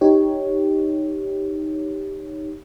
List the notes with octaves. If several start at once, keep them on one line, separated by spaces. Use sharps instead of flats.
D#4 G4 C#5